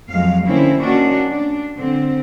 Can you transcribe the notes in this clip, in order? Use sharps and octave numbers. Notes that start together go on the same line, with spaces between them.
F2 F#3 G#3 F5
D3 A#3 C4 C#4 E4
D#3 A#3 C#4 D4 F#4
D4
D3 C4